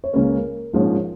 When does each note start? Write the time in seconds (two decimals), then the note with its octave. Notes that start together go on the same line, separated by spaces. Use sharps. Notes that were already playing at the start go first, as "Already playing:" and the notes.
0.04 C#5
0.13 C#2 C#3 A#3 C#4 A#4
0.73 A#1 G#2 F3 G#3 C#4